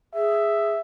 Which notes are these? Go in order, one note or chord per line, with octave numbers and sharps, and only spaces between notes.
G#4 E5